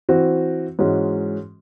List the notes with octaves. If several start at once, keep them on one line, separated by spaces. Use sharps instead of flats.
E3 C4 F#4
G#2 E3 G#3 C#4 F#4